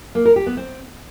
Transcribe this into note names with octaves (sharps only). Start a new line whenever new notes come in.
A#3
A#4
G4
B3
C4